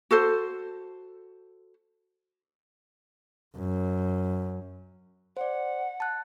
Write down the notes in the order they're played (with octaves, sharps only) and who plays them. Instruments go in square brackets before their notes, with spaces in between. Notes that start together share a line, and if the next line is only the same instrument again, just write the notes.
[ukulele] F#4 A4 C5
[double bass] F#2
[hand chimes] C5 D5 [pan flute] F#5
[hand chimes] A5 F#6